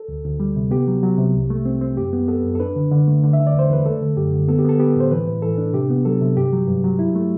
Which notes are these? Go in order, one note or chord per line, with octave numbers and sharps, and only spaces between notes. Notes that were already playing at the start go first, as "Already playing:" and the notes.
Already playing: A4
D2
D2
G3
C3
B3 G4
F#3
F#3
C3
C2
A3
C4
C4
F#2 G4
B3
B3 A4
F#2
A4
D4 B4
D3
D3
A3
D3
E5
D3
D5
E2 C5
E2 B4
A3 A4
D3
F#2 G4
D3
B3 A4
G4
B3 A4
B3 G4
A2 C5
E3 B4
A2
E3 A4
D4
C3 G4
B3
F#3 A4
C3
G2 G4
F#3
G2
F#3
E4
A3